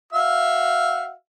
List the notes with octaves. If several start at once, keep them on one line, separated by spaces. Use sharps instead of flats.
F#4 E5 F5